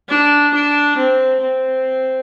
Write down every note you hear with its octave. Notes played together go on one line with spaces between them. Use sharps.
D4
D4
C4
C4